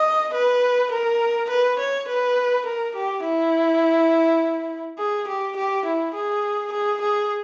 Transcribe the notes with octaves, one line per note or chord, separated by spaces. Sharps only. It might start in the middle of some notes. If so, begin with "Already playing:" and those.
Already playing: D#5
B4
A#4
B4
C#5
B4
A#4
G4
E4
G#4
G4
G4
E4
G#4
G#4
G#4